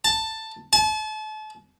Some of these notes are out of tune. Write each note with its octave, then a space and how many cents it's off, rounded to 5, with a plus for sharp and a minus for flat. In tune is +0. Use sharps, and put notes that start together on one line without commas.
A5 +10
A5 -35